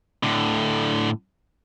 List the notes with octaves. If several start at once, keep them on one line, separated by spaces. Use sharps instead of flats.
A2 D3